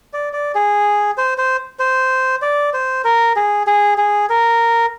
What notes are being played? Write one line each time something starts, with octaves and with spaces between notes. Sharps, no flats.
D5
D5
G#4
C5
C5
C5
D5
C5
A#4
G#4
G#4
G#4
A#4